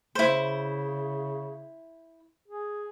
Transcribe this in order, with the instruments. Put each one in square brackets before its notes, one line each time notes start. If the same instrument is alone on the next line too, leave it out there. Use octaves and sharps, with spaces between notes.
[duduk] C#3 [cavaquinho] E4 C5
[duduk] G#4